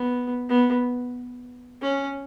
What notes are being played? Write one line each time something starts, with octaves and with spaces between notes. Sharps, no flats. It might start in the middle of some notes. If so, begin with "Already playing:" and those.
Already playing: B3
B3
C#4